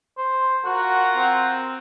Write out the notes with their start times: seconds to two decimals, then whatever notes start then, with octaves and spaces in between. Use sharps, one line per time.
0.18 C5
0.65 F4 F#4 A#4 F#5
1.16 C4